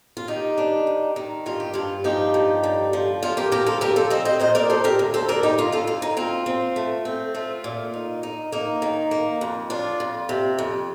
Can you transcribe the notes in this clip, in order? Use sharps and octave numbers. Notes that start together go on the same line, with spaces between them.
F4
D#3 D#4 G4
D4
D#2
D#3
G2 F4
G4
G2 F4
F3 D#4 G4
G2
D3
F3
F3 F4
G4 A#4
D2 G4 A#4
F4 A4
F3 G4 A#4
A4 C5
C4 C5 D#5
C5 D#5
A#2 C5 D#5
A#4 D5
A#2 A4 C5
G4 A#4
D2
A4 C5
D2 A#4 D5
D#4 G4
D2 F4
F4 A4
D2 F4
D#4
C4 F4
C4
A3
C4
A3 F4
A#2
D#4
D#4
A#3 D#4
D#3
A#3
F2
D4 F4
F2
C3
F2